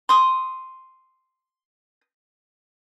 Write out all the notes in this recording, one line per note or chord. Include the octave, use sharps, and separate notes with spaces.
C6 D#6